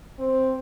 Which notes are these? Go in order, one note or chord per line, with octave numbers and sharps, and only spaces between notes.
C4